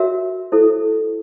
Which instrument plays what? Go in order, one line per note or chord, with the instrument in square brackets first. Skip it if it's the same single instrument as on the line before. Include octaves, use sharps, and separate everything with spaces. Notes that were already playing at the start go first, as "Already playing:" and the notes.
Already playing: [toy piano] F#4 A#4 C#5 E5
E4 A4 C5